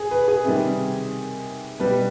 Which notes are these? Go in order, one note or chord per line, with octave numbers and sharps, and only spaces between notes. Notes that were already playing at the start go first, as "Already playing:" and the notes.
Already playing: G#4
B4
G#4
C3 D#3 G3
B2 G3 B4